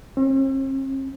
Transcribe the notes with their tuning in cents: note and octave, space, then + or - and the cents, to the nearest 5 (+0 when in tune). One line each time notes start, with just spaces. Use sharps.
C4 +45